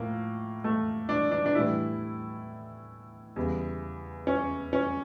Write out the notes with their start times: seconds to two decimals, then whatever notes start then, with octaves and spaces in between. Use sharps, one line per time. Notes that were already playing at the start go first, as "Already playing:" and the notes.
Already playing: A2 F3 A#3
0.64 A3
1.09 D4
1.31 D4
1.46 D4
1.55 A2 E3 G3 E4
3.36 E2 C#3 G3
4.27 C#4
4.73 C#4